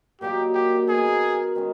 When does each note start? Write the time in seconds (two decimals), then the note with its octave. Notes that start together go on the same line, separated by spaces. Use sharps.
0.21 A#2 F#3 A#3 D#4 G4
0.55 G4
0.88 B3 D#4 F#4 G#4 A#4
1.55 D#3 G#3 C#4